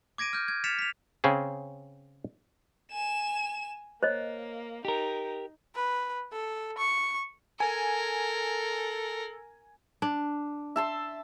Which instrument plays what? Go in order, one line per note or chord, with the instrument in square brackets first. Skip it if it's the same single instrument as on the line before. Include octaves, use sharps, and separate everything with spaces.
[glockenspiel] D6 G#6 A#6 D7 D#7
F6 G6
G#6
F6 A6 B6 C#7 E7 F7
B6 F7
[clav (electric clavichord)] C#3 C4 C#4 G#4
[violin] G#5 E7
[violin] A#3 [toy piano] C5 C#5 D#5
[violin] D#4 [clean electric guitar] G4 A#4
[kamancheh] B4
A4
C#6
[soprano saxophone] A4 [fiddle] A#4 [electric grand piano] G#5
[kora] D4
[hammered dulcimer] E5 A5 C6